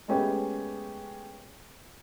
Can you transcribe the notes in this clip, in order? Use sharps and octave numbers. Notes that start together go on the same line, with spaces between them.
G#3 A3 B3 C#4 G4 G#4